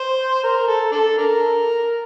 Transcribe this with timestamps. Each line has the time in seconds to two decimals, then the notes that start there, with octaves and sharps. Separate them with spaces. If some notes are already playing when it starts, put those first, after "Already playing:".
Already playing: C5
0.44 A#4
0.68 A4
0.92 D4 A4
1.17 D4 A#4